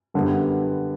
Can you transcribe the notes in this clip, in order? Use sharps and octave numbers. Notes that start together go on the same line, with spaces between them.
F#2 D3 G3 B3